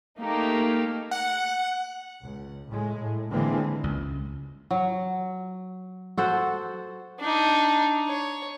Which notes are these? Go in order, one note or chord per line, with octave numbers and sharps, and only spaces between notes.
A3 A#3 D#4 G4
F#5
C#2
A2 G#3
A2
D3 E3 G#3 A#3 C4
C#2
F#3
F#4 A4 C5 F#5
D4 D#4
C#5